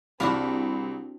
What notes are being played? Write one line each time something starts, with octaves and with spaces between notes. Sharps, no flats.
C2 C4 D4 F#4 F5 B5